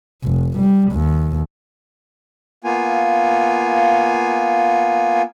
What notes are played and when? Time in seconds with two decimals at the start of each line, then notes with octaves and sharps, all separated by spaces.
0.24 F1
0.59 G3
0.92 D#2
2.64 A#3 B3 F4 G#5